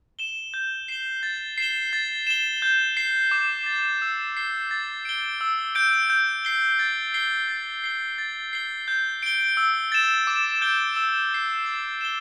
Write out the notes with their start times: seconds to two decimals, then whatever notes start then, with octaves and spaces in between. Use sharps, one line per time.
0.19 E7 G7
0.54 G6
0.88 C7 E7 G7
1.23 A6
1.58 C7 E7 G7
1.93 A6
2.27 E7 G7
2.62 G6
2.97 C7 G7
3.31 D6
3.66 A6 E7
4.02 E6
4.37 C7 G7
4.71 A6
5.05 D7 G7
5.41 E6
5.75 G6 D7 G7
6.10 G6
6.45 C7 G7
6.79 A6
7.14 C7 G7
7.48 A6
7.84 C7 G7
8.18 A6
8.53 C7 G7
8.88 G6
9.23 D7 G7
9.57 E6
9.92 A6 E7
10.27 D6
10.61 G6 D7 G7
10.96 E6
11.31 G6 C7
11.66 A6
12.01 E7 G7